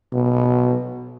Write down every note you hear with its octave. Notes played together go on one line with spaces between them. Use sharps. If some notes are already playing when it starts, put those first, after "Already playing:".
B2